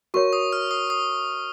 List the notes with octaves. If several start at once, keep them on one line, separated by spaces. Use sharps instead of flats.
F#4 A#4 C#5 C#6
D#6
F6
D#6
D#6